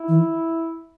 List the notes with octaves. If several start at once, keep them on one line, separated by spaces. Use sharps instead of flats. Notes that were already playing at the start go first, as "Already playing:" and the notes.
Already playing: E4
E3